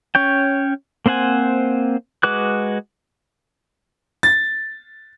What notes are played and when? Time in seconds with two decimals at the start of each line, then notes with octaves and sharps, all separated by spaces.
0.15 C#4 C#5 G5
1.06 A#3 C4 C5 F#5 G#5
2.23 G#3 F#4 B4 D6 F#6
4.23 A6